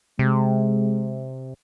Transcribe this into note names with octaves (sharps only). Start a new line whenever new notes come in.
C3 G#3